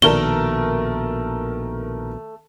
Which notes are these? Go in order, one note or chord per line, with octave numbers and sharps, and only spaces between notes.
A#1 B2 D#3 A3 A#4 A5 G7